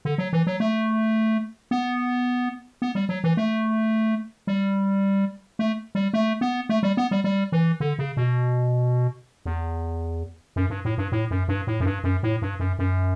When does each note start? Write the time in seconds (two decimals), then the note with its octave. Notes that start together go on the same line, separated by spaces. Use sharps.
0.05 D3
0.18 F#3
0.33 E3
0.47 F#3
0.60 A3
1.71 B3
2.82 B3
2.95 G3
3.09 F#3
3.24 E3
3.37 A3
4.47 G3
5.59 A3
5.95 G3
6.14 A3
6.41 B3
6.69 A3
6.83 G3
6.97 B3
7.11 G3
7.24 G3
7.52 E3
7.80 D3
7.99 C#3
8.17 B2
9.46 E2
10.56 F#2
10.70 G2
10.85 A2
10.98 G2
11.12 A2
11.31 F#2
11.48 G2
11.67 A2
11.80 F#2
11.86 G2
12.04 F#2
12.23 A2
12.42 G2
12.60 F#2
12.79 F#2